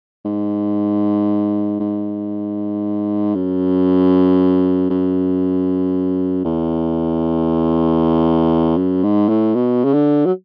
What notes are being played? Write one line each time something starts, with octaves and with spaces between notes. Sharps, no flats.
G#2
G#2
F#2
F#2
E2
F#2
G#2
A2
B2
C#3
D3
F#3